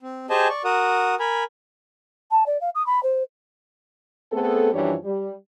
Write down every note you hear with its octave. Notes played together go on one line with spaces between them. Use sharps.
C4
G4 G#4 C5 D#5 G#5 A5
D5 C#6
F#4 A#4 F#5 D#6
A#4 G#5 B5
A5
D5
F5
D#6
B5
C5
A3 B3 C4 G#4 A4
F#2 E3 F3 G3 D4 C#5
G3